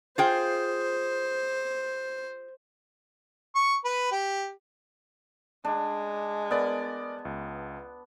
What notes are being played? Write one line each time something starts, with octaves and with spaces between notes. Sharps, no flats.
F4 G#4 C5 G5
C#6
B4
G4
G#3 D4
B3 A#4 D5
C#2